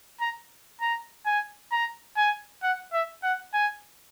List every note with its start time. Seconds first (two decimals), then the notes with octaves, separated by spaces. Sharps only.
0.21 A#5
0.81 A#5
1.26 G#5
1.72 A#5
2.17 G#5
2.63 F#5
2.93 E5
3.23 F#5
3.54 G#5